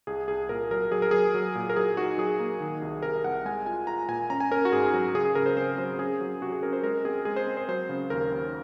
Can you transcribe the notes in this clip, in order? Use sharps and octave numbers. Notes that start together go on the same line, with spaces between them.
C2 G#4
C2 G#4
A#2 A#4
F#3 A#4
F#3 G#4
A#4
F#3 G#4
F#3
A#2
A#4
F#3 G#4
D#4 F#4
F#3 G#4
A#3
D#3
C2
C3 A#4
C2 F#5
G#3 G#5
F4 G#5
F4 A#5
A#2 G#5
C#4 A#5
G#5
C#4 A#4
F#4
G#2 G#4
F#3
C#3 G#4
G#4
C#3 A#4
C5
C4 C5
F#3 C5
C#4 G#4
F#3
C3 F#4
G#4
C#4 A#4
C5
G#3 A#4
C4 G#4
G#3 G#4
C5
C4
C5
F#3 C5
C#3
D#2 A#4
D#2